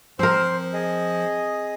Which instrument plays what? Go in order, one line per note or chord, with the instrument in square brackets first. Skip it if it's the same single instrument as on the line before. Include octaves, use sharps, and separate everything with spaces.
[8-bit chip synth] F3 [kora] C4 A#4 [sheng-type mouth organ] C5
[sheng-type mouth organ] G#4 D#5